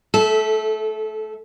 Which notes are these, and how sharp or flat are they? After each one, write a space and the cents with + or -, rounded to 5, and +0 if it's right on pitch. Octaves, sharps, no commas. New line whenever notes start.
A3 +0 A4 -25 E5 -15